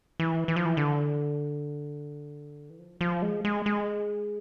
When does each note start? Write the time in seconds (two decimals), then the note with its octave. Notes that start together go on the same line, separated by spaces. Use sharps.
0.20 E3
0.48 E3
0.56 F3
0.65 E3
0.77 D3
2.70 E3
2.79 F3
3.01 F3
3.22 G#3
3.45 G#3
3.66 G#3